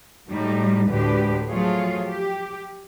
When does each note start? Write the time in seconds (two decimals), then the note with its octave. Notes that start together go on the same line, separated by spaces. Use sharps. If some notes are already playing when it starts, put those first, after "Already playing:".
0.28 A2 F#3 G3 D#4
0.89 D2 A2 D3 G#3 G4 B4
1.49 F3 F#3 A3 F4 G#4 C#5
2.07 G4